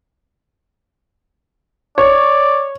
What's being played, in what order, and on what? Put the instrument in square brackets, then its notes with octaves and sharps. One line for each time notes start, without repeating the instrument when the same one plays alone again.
[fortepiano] C#5 [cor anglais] D5